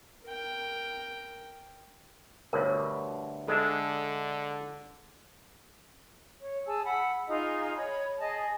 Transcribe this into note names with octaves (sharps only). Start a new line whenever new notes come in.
A#4 G5
D2 G2 B2 A#4 C#5
D3 G#3 D4 A4 E5
C#5
G#4 G#5 A5 E6
F#5 A5 B5 E6
D#4 F4 G#4 D#5
C#5 D#5 B5
G#4 D#5 G#5 A5